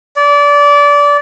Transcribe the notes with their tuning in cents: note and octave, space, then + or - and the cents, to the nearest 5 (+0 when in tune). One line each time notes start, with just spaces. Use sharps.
D5 -25